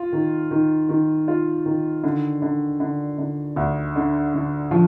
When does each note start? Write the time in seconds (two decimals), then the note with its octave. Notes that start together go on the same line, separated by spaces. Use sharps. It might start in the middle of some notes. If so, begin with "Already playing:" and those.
Already playing: F4
0.13 D#3
0.51 D#3
0.89 D#3
1.28 F4
1.66 D#3
2.04 D3
2.42 D3
2.80 D3
3.18 D3
3.56 D2
3.96 D3
4.34 D3
4.71 F3